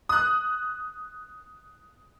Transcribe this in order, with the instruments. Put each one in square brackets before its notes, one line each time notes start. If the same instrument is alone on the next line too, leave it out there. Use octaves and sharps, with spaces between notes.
[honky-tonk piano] D#6 F#6